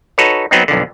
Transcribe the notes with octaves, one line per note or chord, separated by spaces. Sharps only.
D#4 F#4 A4 B4 C#5
F#3 B3 C4 D#4
B1 F2 D3